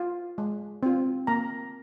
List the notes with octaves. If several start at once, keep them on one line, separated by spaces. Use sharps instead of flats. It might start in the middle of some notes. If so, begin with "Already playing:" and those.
Already playing: F4
G#3
C4 F4
A#3 A#5